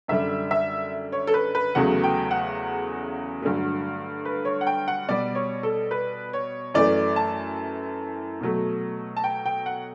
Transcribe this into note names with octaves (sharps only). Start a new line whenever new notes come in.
F#2 D3 G3 E5
E5
C#5
A4
B4
B4
E2 C#3 F#3 A3 F#5
G5
F#5
G2 D3 F#3 A3
B4
C#5
F#5
G5
F#5
B2 G3 D5
C#5
A4
B4
C#5
F#2 E3 A3 D5
A5
B2 F#3 A3
A5
G5
G5
F#5